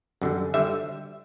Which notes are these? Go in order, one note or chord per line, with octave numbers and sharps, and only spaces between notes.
F#2 D3 G3
D3 G3 E5